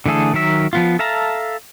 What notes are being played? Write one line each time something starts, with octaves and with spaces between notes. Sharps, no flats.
D3 E3 A3 G#4 A4
D#3 F#3 A#4 E5
F3 B3 F4
A4 E5 F5 A5 A#5